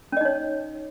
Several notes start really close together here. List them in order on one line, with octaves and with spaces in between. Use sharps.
C#4 D#5 D#4 C#5